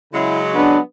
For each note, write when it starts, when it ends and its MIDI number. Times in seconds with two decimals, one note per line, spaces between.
0.13 0.76 49
0.13 0.76 54
0.13 0.76 56
0.13 0.40 64
0.55 0.80 59
0.55 0.78 62